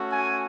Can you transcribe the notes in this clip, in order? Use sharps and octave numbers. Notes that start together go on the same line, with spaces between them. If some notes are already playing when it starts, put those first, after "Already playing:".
Already playing: A3 C#4 F#4
G#5